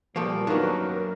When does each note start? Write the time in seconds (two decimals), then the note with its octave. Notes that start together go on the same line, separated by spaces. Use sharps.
0.16 A#2 F3 G3 A3 A#3
0.47 F#2 D#3 F#3 A#3 B3 D4 A#4